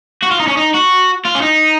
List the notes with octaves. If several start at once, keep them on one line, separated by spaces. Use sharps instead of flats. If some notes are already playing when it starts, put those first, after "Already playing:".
F#4
F4
D#4
C#4
D#4
F#4
F4
C#4
D#4